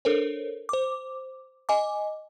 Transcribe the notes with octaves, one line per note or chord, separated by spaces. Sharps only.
D4 A4 A#4 C5 C#5
C5 D6
D#5 G#5 D6